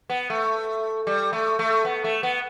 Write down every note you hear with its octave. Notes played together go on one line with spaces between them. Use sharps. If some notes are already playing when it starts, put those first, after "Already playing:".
B3
A3
G3
A3
A3
B3
A3
B3